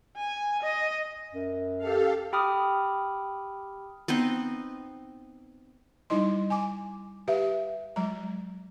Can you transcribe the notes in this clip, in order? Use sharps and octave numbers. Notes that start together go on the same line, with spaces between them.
G#5
D#5
F#2
G4 A4 F5
G4 G5 B5 D6 D#6 F6
B3 C4 D#4 D#5
G3 D#4 E4 D#5 C6
G#5 D6
G4 B4 E5 F5
F#3 G#3 A#5